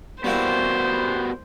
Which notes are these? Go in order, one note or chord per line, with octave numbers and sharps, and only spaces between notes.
G3 A#3 B3 E4 F#4 G4 C5